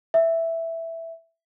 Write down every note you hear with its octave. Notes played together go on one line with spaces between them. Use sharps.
E5